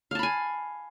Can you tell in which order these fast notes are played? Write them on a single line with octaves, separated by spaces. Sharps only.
F5 A5 B5 G#5